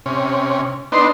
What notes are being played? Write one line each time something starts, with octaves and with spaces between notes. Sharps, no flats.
C3 C#4
B3 D4 D#4 C6